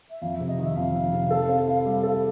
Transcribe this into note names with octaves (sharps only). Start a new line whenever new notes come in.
E5
F2 F5
C3 E5
D#5
D#3 E5
F2 F5
F2
C3
A4
C4
E4
G3
A4